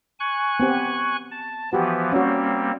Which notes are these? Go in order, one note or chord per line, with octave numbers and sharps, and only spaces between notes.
G#5 C#6 F#6
B3 C4 G4
A5
E3 F3 B3 F#4 G4
G3 A#3 C4 C#4 F#4